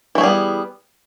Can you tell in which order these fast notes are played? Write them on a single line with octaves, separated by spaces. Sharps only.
E3 A3 G#4 G3 B3